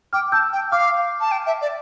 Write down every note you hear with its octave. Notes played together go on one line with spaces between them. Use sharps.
G5 D6 F6
A5 E6 G6
G5
F5 D6 F6
A5
G5
E5
D5